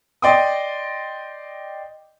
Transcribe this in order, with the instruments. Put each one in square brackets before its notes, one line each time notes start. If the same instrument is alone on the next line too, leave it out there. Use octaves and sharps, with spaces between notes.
[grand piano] D5 D#5 G5 C6 D6 D#6